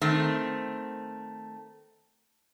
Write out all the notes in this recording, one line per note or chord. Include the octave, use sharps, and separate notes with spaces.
D#3 A3 C4